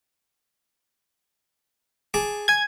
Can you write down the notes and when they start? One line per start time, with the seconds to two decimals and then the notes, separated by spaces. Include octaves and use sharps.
2.14 G#4 A5 D6
2.48 G#5 G#6